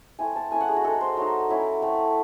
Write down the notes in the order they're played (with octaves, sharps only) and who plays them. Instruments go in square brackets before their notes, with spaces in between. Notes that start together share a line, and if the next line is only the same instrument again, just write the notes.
[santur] A3 C4 E4 G#5
A5
A3 C#4 E4 G#5
F#5
G#4
F#4
G#3 C4 D#4 A4
C5
F#3 A3 D#4
F#3 C#4 E4
F#3 A3 C4